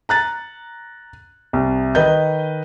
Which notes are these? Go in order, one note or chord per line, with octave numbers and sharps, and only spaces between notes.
A#5 F#6 A6
C2
D#3 B4 D#5 G6